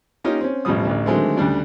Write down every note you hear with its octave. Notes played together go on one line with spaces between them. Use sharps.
A#3 C#4 D#4 F4 G4 A#4
C4 C#4
A1 E2 B2 F3 G3 D#6
A1 D2
D3 D#3 F#3 G#3 A3 C4
D2 C#3 G3 D4 D5